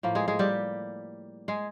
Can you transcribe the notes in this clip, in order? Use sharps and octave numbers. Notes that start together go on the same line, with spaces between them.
A2 F3 A#3
G#3 G#4
G#3 G#4
G3 G4
G#3 G#4